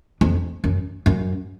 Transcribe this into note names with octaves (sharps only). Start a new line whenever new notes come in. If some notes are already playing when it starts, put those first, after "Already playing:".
F2
F#2
F#2